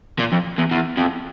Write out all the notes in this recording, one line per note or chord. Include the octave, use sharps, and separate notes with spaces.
A#2
F2
E2
E2
F2